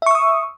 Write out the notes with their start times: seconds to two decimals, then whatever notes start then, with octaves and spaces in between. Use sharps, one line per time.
0.02 E5
0.06 C#6
0.11 E6
0.15 D#6